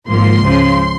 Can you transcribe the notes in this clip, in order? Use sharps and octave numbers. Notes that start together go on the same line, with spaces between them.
G#1 G#2 F3 A#3 C6
C#2 C#3 F3